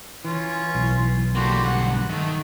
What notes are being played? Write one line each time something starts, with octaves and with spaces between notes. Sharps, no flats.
E3 C#4 F4
B1
G3 A#3 F#4 A4 C6
D2 G2 F#5
D#3 A3